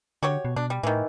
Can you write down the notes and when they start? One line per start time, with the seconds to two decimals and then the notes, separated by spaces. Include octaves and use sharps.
0.23 D3 F#4 G4 C#5
0.45 B2
0.56 B2 D4
0.70 G3
0.83 A2 D#3 E3